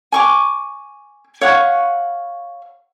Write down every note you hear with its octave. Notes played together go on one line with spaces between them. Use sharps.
G#5 C#6 D6
C#5 F5 F#5 C#6